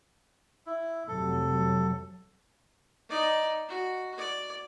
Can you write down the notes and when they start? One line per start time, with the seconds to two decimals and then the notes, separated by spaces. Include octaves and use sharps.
0.66 E4
1.08 F1 C3 F#3 A4
3.08 D#4 D5
3.69 F#4
4.18 D5